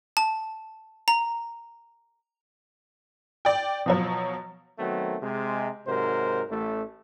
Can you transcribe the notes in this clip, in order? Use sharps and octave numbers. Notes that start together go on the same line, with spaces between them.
A5
A#5
D5 G5
B2 F3 F#3
D#3 F#3 A3 B3 C4
C3 G#3
G#2 C3 F#3 A#4 C5
A1 A3